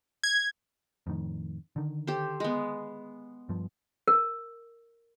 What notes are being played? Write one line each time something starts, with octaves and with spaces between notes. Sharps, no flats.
G#6
F2 A2 D#3
D3 D#3
G4 A4 C5
G#3 B3
G2 F3
A#4